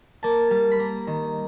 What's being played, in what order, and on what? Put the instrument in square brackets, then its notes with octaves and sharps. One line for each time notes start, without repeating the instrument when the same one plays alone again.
[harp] A#3 A5
G3 A5
B5
A#3 A#5
D#3 A#5